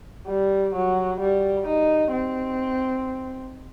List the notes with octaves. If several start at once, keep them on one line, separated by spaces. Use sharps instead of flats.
G3
F#3
G3
D#4
C4